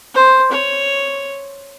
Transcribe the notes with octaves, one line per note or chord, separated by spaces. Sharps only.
C5
C#5